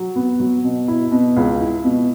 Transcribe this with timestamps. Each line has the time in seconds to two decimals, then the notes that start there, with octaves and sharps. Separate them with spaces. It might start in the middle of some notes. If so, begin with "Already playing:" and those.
Already playing: F#3
0.16 B3
0.40 F#3
0.64 B2
0.88 E4
1.12 B2
1.37 C#2
1.60 E4
1.84 B2